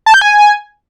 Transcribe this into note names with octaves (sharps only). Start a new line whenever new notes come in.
A5
G6
G#5